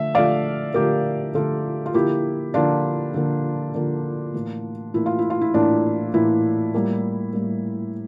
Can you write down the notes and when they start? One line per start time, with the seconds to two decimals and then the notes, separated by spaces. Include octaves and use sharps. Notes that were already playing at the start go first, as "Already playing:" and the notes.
Already playing: D3 F3 A3 E5
0.15 D3 F3 A3 D5 F5
0.74 D3 F3 A3 G4 A#4
1.34 D3 F3 A3 F4 A4
1.86 F4
1.94 D3 F3 A#3 E4 G4
2.54 D3 F3 A#3 D4 F4
3.14 D3 F3 A#3
3.74 D3 F3 A#3
4.34 A2 E3 A#3
4.94 A2 E3 A#3 E4
5.06 F4
5.19 E4
5.30 F4
5.41 E4
5.54 A2 E3 A#3 D4
6.14 A2 E3 A#3 E4
6.74 A2 G3 A#3
7.33 A2 G3 A#3